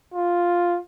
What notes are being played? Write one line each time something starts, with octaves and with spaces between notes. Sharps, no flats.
F4